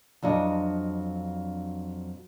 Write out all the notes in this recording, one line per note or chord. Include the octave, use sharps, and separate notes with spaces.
F2 F#3 D4 D#5